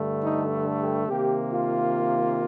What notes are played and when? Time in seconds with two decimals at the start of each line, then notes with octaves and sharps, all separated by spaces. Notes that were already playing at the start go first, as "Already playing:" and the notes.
Already playing: G2 D3 A3
0.23 D#4
0.80 G4
1.08 C3 D#3 A#3 G4
1.51 F4